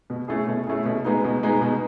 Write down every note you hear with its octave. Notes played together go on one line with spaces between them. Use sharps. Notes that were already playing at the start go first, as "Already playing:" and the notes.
B2
A3 C#4 E4 G#4
B2
A3 C#4 E4 G#4
B2
G#3 B3 D#4
B2
G#3 B3 D#4
B2